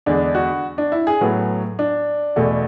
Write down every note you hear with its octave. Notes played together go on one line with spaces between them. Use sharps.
E2 D3 G#3 D4
F#4
D4
E4
G#4
A2 F#3 B3
D4
E2 B2 A3